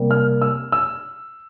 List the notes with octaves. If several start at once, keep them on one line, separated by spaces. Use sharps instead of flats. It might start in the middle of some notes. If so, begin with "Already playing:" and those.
Already playing: C3 G3 A#3
F6
E6
E6